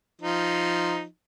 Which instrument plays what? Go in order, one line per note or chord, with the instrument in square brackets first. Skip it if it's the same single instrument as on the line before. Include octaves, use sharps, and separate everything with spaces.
[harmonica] F3 D#4